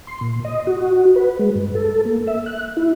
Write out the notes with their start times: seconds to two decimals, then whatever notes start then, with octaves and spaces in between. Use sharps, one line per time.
0.07 C6
0.21 A#2
0.45 D#5
0.67 F#4
1.16 B4
1.39 G#3
1.55 G2
1.75 A4
2.05 A#3
2.27 E5
2.46 F#6
2.77 E4